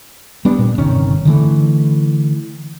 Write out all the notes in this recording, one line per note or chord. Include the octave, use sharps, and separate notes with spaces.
G3 B3 D4
A#2
G1 C3 D#3 C#4
D3 E3 A3